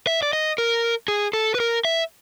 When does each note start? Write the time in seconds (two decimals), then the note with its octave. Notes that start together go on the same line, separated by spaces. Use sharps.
0.07 E5
0.22 D5
0.33 D#5
0.58 A#4
1.08 G#4
1.33 A4
1.55 B4
1.60 A#4
1.85 E5